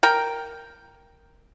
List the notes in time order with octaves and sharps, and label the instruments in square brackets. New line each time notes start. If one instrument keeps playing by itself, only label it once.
[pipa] A#4 G5